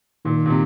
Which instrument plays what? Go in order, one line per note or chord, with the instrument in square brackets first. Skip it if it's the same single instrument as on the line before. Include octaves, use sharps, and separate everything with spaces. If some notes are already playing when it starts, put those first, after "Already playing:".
[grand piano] A#2 [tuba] D#3
[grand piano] A#2
C3